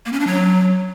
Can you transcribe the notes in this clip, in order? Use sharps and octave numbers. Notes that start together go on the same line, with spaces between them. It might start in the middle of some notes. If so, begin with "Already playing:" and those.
A#3
C#4
D4
F#3